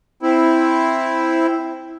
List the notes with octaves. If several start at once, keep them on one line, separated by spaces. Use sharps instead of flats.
C4 E4